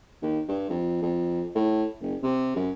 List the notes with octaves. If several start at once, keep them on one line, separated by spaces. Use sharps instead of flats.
D#2
G2
F2
F2
A2
F#1
C3
F#2